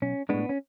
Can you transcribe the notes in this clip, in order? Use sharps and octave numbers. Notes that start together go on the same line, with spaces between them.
B1 C#4
A2 G#3 B3 D4
C#4